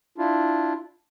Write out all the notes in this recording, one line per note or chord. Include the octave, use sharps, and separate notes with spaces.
D4 E4 F4